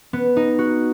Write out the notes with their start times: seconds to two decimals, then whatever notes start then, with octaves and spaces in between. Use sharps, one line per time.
0.13 B3
0.36 D#4
0.58 F#4